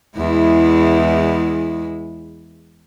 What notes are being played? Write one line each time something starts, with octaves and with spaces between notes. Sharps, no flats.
E2 G#3 E4